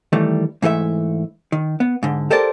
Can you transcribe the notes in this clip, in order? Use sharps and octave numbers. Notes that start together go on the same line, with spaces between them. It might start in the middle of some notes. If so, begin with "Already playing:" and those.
D#3 E3 G3 A3
G#2 E3 A3 G#4 E5
D#3
B3
G#2 D3
G4 A4 A#4 C5 D5 A5